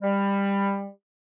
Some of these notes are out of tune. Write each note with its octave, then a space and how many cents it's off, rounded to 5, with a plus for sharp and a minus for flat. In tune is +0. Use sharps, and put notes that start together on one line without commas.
G3 +20